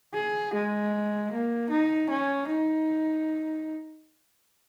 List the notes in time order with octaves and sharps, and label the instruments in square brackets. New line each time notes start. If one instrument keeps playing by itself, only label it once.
[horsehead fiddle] G#4
G#3
A#3
D#4
C#4
D#4